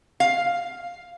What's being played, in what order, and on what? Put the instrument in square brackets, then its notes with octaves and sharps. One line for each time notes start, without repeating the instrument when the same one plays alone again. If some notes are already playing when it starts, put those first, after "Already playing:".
[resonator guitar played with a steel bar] F5